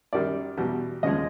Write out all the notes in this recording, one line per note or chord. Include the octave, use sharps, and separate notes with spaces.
F#2 D#3 G3 D5
E2 B2 G3
D#2 C#3 F3 G#3 D#5